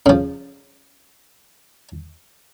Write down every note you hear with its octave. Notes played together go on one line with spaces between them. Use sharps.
C#3 F3